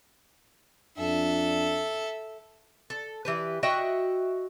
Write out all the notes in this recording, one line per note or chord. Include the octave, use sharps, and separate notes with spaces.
F2 D4 A4 E5
A4
E3 G4 B4
F#4 D#5 E5 G5